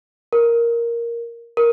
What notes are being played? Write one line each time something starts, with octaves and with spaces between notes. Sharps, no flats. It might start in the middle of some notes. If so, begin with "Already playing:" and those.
A#4
A#4